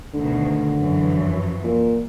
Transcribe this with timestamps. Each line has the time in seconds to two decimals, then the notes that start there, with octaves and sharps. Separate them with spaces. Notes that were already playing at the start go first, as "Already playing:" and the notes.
0.14 D2 B2 D3 D#3
0.76 F#2 E3 F3
1.64 A#2